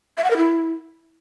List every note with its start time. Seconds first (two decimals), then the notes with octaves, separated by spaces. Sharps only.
0.18 E5
0.24 F#5
0.31 A#4
0.37 E4